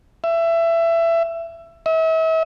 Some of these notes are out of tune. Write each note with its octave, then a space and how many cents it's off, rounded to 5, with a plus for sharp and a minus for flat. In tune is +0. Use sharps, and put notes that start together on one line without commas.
E5 +20
E5 -40